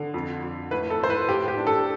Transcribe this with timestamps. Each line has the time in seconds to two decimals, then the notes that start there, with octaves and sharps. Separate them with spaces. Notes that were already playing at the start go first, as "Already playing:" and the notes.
Already playing: D3
0.14 F2
0.43 F2
0.71 A2 B4
0.90 A4
1.00 A2 C5
1.10 B4
1.28 A2 G4
1.48 G4
1.57 D4
1.67 A4